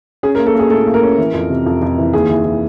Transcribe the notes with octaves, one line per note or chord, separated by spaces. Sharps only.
C#4 G#4
A#4
A#3
A4
A#3 G#4
A2 A4
A#3
A#4
C#4
E3
F2
C3
F2
F2
E3
D#2 G#4
E3
E3